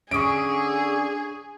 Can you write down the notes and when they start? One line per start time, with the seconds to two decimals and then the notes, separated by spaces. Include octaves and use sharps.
0.11 D3 C#4 G#4 C#6 D#6 D7